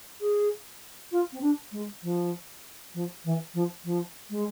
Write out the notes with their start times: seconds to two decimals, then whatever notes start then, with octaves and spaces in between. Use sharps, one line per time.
0.21 G#4
1.12 F4
1.33 C4
1.42 D4
1.72 G#3
2.03 F3
2.94 F3
3.25 E3
3.54 F3
3.85 F3
4.30 G#3